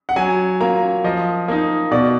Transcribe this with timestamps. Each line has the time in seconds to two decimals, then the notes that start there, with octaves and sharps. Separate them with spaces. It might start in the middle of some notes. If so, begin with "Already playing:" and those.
0.09 F#5
0.16 F#3 G#5
0.61 A#3 F4 A#5
1.04 F3 D#5
1.48 A#3 D#4
1.91 B2 D5